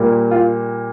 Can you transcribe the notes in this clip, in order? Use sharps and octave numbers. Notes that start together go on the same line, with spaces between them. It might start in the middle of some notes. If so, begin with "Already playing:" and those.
Already playing: A#2 G3 A#3
F4